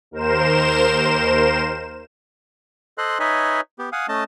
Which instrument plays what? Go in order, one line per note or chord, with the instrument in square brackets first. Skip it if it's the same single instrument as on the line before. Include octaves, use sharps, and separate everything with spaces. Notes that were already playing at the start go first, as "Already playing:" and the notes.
[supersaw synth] D#2 A#4 C5 E7
[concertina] A4 C5 D#5 C6 F#6
D#4 B4 C#5 D#5 E5 G#5
B3 G4
F5 F#5 G#5 D#6
A3 C#4 D#5 A5